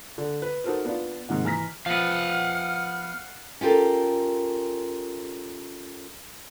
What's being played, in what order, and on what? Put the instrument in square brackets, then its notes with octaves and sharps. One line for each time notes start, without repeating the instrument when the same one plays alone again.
[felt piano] D3
B4
D#4 F#4 A4 A#4 C5
B3 D4 F4
G#2 C3 D#3 F#5
E3 A#5 F6 A#6 B6
[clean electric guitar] F3 B3 [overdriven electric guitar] F5 F#5 [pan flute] F6
[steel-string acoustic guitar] C#4 F4 G4 A4 A#4